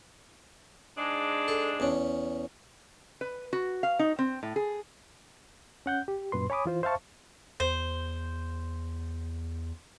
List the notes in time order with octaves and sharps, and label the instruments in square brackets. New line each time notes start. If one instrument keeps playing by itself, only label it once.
[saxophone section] G#2 G#3 D4
[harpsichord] A4
E2 C#4
[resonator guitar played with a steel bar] B4
F#4
F5
D#4
C4
A2
G#4
[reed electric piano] C#4 F#5 G6
G4
F#2 A#2 B4 C6
C#5 G#5 B5 D6 D#6
E3 F4 C5
C5 E5 F5 A5 C#6
[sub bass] E2 [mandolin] C5